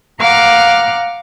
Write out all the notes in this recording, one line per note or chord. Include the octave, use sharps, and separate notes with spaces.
F5 F#5 A#5 D6 F6 F#6